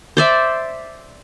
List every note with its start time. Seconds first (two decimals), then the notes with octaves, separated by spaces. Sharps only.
0.17 C5 D5 E5